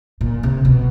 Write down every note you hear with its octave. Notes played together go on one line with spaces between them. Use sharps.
A#2
C3
B2